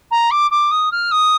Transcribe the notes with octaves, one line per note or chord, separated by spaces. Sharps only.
A#5
D6
D6
D#6
F6
D#6